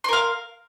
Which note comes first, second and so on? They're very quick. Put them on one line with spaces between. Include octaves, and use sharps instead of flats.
C6 A#4 F5